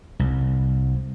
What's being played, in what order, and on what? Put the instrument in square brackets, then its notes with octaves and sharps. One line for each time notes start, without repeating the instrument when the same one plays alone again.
[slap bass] C2